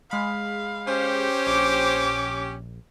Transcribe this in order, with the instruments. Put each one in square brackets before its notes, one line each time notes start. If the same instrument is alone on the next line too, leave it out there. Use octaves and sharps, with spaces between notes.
[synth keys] G#3 B5 [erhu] F5
[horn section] C#4 G4 [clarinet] C5
[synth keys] A#1 [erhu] D6